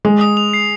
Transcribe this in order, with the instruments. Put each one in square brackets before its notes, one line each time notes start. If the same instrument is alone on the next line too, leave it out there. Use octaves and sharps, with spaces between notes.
[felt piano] G#3 [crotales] D#6
[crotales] D#6
F7
C7